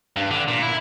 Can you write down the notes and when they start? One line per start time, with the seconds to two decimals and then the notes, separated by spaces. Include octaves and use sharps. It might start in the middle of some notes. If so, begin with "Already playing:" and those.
0.16 G2
0.31 D3
0.48 A#2
0.62 E4